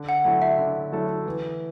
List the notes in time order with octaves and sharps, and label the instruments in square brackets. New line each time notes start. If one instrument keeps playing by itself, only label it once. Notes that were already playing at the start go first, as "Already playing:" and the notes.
Already playing: [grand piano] D3
[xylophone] F#5
[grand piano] F#3 A3 E4 A4 [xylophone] F#5
[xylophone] E5
[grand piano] D3
F#3 A3 E4 A4
E3